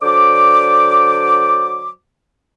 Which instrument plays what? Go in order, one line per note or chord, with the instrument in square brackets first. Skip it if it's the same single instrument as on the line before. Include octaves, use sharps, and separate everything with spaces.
[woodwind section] D3 F#3 C5 D5 D6